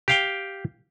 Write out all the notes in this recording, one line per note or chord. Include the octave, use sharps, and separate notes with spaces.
G4 F5 G5